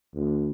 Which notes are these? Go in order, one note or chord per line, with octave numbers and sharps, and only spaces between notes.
D2